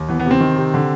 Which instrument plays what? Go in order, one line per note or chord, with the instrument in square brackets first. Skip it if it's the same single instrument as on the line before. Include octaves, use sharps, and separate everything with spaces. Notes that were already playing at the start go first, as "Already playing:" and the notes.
Already playing: [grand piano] D#2
E3 B3
B3
C3
C4
D#3
C3
D3